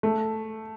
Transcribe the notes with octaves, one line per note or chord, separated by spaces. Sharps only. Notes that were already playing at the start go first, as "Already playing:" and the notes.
A3